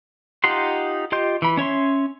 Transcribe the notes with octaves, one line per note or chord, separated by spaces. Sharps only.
D#4 F4 G4 F#5 C6
F4 G4 D#5 C6 G6
E3 B5
C#4 C#5 E5 C6